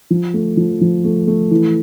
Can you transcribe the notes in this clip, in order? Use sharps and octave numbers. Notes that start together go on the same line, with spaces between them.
F3
A3
F3
F3
A3
A3
E3